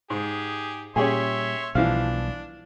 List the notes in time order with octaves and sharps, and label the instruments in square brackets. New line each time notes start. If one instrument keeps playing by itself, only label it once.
[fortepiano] G#2 [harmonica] G4 G#4
[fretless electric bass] A#2 G3 [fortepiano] C#4 G4 G#4 [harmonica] C#5 E5 C6
[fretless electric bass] B1 B2 G3 [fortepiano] E3 F3 F5 [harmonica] D4